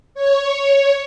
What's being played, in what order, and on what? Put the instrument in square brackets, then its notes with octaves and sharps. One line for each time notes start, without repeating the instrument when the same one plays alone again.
[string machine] C#5